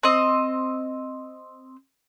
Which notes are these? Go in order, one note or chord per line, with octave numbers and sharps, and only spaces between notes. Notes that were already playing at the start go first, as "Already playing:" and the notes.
C4 D#5